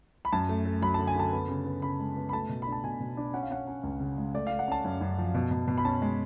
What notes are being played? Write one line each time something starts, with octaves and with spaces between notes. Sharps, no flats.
B5
F#2 A5
A3
A3
F#3 B5
D3 A5
G#5
D3 A5
B3
C#3
B3
C#3 B5
G#3
B3
B5
A3 A5
B2
B5
D4
A5
B2 G#5
B2
D4
C#4 F#5
F5
C#4 F#5
C#4
C#2
C#3
G#3
A3 D5
A3 F5
F#5
C#4 A5
F#2
F#2
F3
B2
B2
B2
B5
C#4 A5
G#3